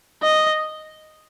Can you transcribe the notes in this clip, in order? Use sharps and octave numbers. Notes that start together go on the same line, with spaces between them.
D#5